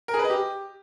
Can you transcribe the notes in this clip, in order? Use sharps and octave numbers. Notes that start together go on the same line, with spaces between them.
A#4
G#4
B4
D#5
G4